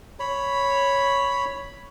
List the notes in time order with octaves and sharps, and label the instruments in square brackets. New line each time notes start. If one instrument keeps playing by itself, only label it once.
[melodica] C#5 B5